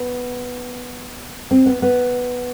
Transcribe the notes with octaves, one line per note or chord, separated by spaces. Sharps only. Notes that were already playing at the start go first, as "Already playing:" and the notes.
Already playing: B3
C4
B3
B3